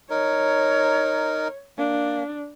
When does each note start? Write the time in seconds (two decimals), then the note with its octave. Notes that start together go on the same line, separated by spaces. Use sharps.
0.10 D#4 A#4 C#5
1.78 A#3 D4